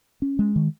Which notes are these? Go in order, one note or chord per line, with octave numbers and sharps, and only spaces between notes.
C#4
G#3
D#3